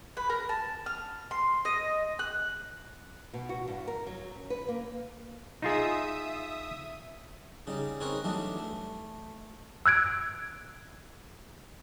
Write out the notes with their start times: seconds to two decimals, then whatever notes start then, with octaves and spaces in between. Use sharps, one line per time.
0.17 B4
0.30 A#4
0.49 A5
0.86 F6
1.31 C6
1.65 D#5
2.19 F#6
3.33 B2
3.49 F#4
3.68 G2
3.88 A#4
4.07 F#3
4.36 C#4
4.50 B4
4.68 A#3
5.62 D#4 F4 G#4 E5 D#6
7.67 C#3 G3 D#4
8.00 C4 D#4 G#4 A#4 B4 C#5
8.24 E3 F#3 G3 A3 D4 D#4
8.58 A3
9.86 E6 F#6 G#6 D7